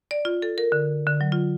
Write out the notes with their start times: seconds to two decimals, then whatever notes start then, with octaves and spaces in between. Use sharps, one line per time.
0.11 D5
0.25 F4
0.42 A4
0.58 A#4
0.72 D3
1.07 D3
1.21 F#3
1.32 F4